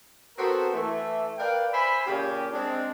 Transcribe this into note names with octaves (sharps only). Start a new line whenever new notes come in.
B3 C4 F#4 A4 A#4 C5
E3 A3
A#4 B4 D5 F5 G5
C5 E5 G#5 B5
A#2 C#3 C#4 G4
G#3 C4 D4